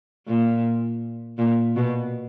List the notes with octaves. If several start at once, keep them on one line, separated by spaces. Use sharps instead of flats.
A#2
A#2
B2